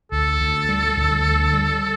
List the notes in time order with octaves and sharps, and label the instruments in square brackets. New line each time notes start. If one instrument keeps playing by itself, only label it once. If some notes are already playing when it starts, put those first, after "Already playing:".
[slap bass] D2 [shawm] A4
[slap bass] D2
G3
D2
D3
G3